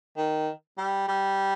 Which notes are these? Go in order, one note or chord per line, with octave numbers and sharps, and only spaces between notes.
D#3
G3
G3